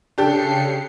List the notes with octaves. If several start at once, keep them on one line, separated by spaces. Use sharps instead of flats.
C#3 D4 G4 A4 C7 C#7